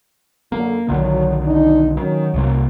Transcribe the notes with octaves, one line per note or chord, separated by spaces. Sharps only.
F#2 D3 A#3
B1 D3 D#3 F#3
D4 D#4
D#3 F#3 C#4
C2 C3 A#3